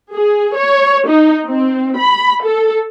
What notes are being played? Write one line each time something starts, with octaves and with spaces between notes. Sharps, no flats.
G#4
C#5
D#4
C4
B5
A4